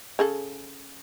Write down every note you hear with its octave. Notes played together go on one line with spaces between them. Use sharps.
C#3 G#4 A4